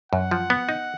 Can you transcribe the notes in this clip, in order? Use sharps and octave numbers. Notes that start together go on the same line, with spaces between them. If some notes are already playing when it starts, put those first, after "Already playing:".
F#2 F#5
F3
B3
D#4